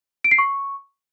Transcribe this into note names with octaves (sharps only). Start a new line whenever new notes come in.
D7
C7
C#6